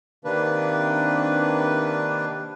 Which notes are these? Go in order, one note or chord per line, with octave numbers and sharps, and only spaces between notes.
C3 D#3 A#3 D4 B4